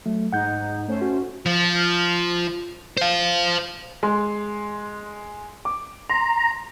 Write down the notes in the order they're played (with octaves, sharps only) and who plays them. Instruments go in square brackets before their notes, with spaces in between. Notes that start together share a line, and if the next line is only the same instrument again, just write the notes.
[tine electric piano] F#3 A3
[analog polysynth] G#2 D#4 [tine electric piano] F#5 G6
[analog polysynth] A3 C#4 C5
[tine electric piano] F#4
[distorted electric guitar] F3
C5 F5
[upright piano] G#3 C6
D6
[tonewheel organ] A#5 [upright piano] C6